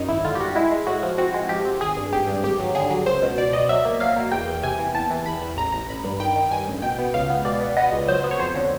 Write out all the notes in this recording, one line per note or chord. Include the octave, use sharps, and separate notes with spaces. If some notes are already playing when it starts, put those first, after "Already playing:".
Already playing: F#2 D#4
G#1 E4
D3 F4
G4
G3 F#4
G#3 E4
G#3
A2 F#4
F3
C4 F#4
G#3
F3 G4
C4
G#1 G#4
G2
G#1 G4
G2
G#1 G4
F#3
D3 G#4
F#3
C#2 C5
B2
B2 D5
B2 D#5
F#3 E5
A#3
F#3 F5
A#3
E2 G5
E2
C3 G#5
E3
E2 A5
E3
E2 B5
E2
A1 A#5
A1 A#5
A1 B5
G2
D#3 G5
D#3
G2 G#5
A1
B2 G5
B3
C#2 F5
B3
B2 D5
B3
B3 D#5
C#2
F#3 C5
B3
C#5
F2 C5
D3